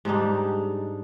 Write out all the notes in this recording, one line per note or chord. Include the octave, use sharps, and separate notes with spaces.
G#2 G3 D4 D#4